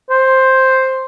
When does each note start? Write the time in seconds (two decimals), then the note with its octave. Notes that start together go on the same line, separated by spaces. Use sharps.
0.10 C5